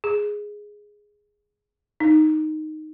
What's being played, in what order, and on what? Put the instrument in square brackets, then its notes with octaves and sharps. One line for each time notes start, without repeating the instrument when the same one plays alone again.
[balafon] G#4
D#4